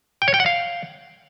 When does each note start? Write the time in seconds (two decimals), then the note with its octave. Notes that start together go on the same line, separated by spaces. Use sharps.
0.22 G5
0.28 C#5
0.34 G5
0.40 F#5
0.46 F5